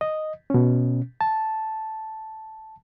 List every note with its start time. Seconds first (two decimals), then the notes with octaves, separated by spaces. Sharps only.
0.01 D#5
0.50 B2 C#4
1.21 A5